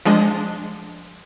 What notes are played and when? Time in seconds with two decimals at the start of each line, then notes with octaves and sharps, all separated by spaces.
0.05 F3 G#3 D4 D#5